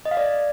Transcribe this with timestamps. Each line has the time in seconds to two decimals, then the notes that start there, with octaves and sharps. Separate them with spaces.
0.06 D#5
0.11 F5
0.17 D5